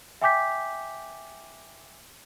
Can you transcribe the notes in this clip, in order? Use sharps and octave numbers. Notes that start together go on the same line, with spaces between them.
E5 G5 G#5 D6 G6 B6